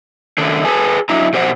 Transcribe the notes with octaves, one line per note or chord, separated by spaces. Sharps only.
D#3 A3 C#4 D4
G#4 B4 G#5 A5
F#3 D4 E4 E5 A#5
B2 G4 C5 D5 F#5